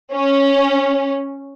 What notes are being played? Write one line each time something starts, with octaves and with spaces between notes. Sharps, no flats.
C#4